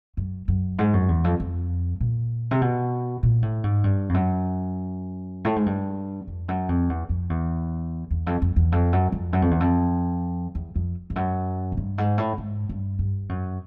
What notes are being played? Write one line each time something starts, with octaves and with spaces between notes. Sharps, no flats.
F#2
F#2
G#2
F#2
E2
F2
F2
A#2
C3
B2
A#2
A2
G#2
G2
F2
F#2
A2
G#2
G2
F2
F#2
F2
E2
F2
E2
E2
F2
F2
E2
F2
F#2
F2
F#2
F2
E2
F2
E2
F2
F2
F#2
G#2
G2
G#2
A2
G#2
G2
G2
F#2